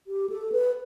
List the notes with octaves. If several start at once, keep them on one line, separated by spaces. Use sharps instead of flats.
G4
A4
B4